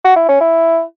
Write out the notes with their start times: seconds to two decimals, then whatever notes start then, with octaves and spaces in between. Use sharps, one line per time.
0.04 F#4
0.16 E4
0.28 C#4
0.40 E4